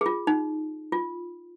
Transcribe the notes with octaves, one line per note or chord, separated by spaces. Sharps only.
G#4
F4
D#4
F4